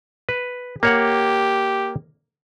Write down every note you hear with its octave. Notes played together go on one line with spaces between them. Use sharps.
B4
A#3 G4 C#5 F#5